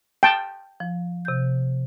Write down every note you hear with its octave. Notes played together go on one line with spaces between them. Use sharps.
G5 A5
F3
C3 G6